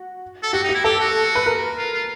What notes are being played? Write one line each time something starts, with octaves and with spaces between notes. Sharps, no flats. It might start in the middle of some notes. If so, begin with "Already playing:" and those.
Already playing: F#4
A4
F#4 G4
D#4
G4
E4
G4 A4
F#4
B4
A#4
F4
F4